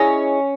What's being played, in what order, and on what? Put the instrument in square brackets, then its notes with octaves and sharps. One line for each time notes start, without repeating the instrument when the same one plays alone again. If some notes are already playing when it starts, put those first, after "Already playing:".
Already playing: [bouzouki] C#4 [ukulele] E4 G#4 D#5